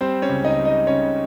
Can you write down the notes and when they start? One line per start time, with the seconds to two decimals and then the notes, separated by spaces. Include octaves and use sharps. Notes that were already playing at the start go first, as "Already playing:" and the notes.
0.01 G3 C4 C5
0.22 C#4 C#5
0.29 C#2
0.45 D#4 D#5
0.59 G3
0.65 D#4 D#5
0.87 C#3 C#4 C#5